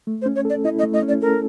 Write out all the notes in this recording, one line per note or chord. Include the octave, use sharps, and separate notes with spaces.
A3
C5
C#4
C#5
A4 D5
E4 D#5
D#5
A3
D#5
C#4
D5
A4 A#4